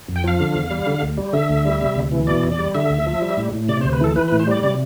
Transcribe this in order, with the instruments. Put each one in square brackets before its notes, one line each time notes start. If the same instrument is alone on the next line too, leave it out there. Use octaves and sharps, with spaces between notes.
[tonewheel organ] F2
G5
F3 F5
D3
E2
G3
D3
D2
G3
D3 E5
D2
G3
C3
D2
E3
B2 D5
E2
D5
G3
D3 E5
D2
F3
G3
A2
A2
C3 D5
C5
D2
B4
E3 A4
E3 B4
B4
A2
C5
G3 D5
C3 D5